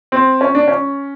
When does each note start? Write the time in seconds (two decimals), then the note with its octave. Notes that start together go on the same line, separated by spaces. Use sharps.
0.12 C4
0.41 C#4
0.55 D4
0.68 C#4